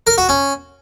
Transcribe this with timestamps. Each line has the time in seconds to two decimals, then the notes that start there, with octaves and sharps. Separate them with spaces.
0.07 A#4
0.18 F#4
0.29 C#4